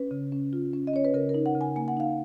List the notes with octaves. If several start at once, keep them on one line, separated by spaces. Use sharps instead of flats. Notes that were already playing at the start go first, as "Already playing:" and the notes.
Already playing: C#4 B4
C#3
C#4
F4
C#4
D#5
C#4 C#5
B4
C#3 A#4
A#4
D#4
F#5
C#3
G#5
A#3 G#5
F#5
D#4 F5